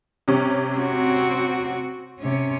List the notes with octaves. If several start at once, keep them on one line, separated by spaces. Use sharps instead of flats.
C3 G3 C#4
C4 F#4
C3 C#4